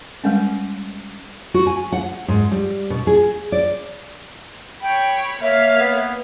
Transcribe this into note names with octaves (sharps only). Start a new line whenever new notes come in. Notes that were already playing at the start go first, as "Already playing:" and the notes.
G3 G#3 C#4
F#4
G#5
F#5
G#2
G3
B2
G#4
D5
C#5 G5 B5
A#3 C#5 E5 F5
B3